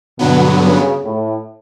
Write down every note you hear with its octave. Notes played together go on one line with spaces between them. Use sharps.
G2 B2 D3 F#3 B3
C#3
A2